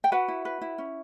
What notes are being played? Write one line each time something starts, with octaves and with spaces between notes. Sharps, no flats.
G5
F#4 B4 F#5
E4
B4
E4
C#4